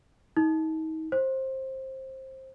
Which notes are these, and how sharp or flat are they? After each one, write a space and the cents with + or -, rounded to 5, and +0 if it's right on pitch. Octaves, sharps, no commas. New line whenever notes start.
D#4 +35
C5 +20